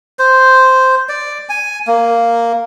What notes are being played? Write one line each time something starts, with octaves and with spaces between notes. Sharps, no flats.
C5
D5
G#5
A#3